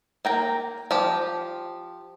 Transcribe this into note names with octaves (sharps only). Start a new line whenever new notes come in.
A#3 G5 A#5
F3 G4